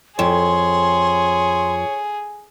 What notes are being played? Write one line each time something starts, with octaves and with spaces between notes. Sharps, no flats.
F2 G#4 C#5 C6